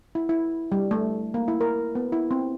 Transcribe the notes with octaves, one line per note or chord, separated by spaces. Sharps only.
E4
E4
G3
A3
A#3
E4
A#4
B3
E4
C4